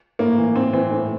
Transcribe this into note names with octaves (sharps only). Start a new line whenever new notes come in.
A2 A#3
E3
A2 C4
E3 C4
A2